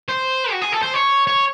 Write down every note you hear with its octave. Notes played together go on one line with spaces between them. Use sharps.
C5
F#4
G#4
A4
C5
C#5
C#5